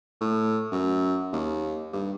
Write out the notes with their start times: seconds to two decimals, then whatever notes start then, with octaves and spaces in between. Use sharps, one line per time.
0.20 A2
0.71 F#2
1.33 D#2
1.93 G2